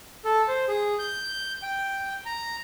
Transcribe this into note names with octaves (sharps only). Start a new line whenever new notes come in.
A4
C5
G#4
G6
G5
A#5